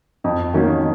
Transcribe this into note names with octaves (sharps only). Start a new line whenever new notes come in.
F2
D#3 F#3 A#3 C#4